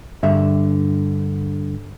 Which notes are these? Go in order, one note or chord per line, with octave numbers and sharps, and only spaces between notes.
G2 D3 E5